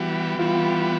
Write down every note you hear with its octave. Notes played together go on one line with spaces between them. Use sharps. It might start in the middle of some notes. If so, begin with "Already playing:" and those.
Already playing: E3 G3 B3 F#4
E3 G3 B3 F4